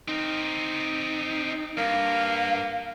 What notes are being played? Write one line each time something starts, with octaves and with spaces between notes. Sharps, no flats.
C4 D#4 A#4
G2 A#3 F5